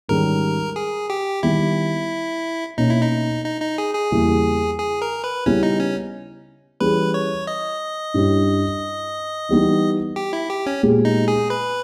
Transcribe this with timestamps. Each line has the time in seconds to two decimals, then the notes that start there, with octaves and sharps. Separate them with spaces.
0.08 G#2 D#3 G3 C#4 G4 A#4
0.76 G#4
1.10 G4
1.43 D#3 G3 B3 E4
2.78 B2 A#3 C#4 D#4
2.89 E4
3.02 D#4
3.45 D#4
3.61 D#4
3.78 G#4
3.95 G#4
4.11 E2 C#3 G3 A#3 E4
4.79 G#4
5.02 A#4
5.24 B4
5.46 C#3 G3 B3 C#4 E4
5.63 D#4
5.80 C#4
6.80 E3 G3 C#4 G#4 B4
7.14 C#5
7.47 D#5
8.14 G2 G3 C#4 E4 G4
9.49 E3 G3 B3 D#4
10.16 G4
10.33 E4
10.50 G4
10.66 C#4
10.83 A#2 G#3 B3 G4
11.05 D#4
11.28 G#4
11.50 B4